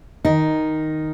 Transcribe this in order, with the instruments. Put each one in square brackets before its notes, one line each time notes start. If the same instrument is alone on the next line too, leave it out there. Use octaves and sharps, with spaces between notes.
[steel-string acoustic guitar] D#3 D#4